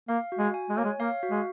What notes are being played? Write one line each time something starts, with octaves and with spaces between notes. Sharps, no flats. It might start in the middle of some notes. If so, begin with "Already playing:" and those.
A#3 F5
F#4
G#3
G#5
G#3
A#3 C#5
G#3
A#3 F5
F#4
G#3